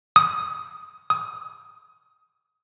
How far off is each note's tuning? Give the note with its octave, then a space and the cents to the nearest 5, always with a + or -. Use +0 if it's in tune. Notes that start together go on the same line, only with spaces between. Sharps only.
D#6 +10
D#6 +20